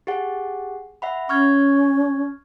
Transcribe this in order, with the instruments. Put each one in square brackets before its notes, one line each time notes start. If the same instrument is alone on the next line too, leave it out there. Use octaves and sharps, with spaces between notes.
[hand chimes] G4 G#4 F#5
E5 F#5 B5
[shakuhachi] C#4 [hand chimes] C#6 F6 G#6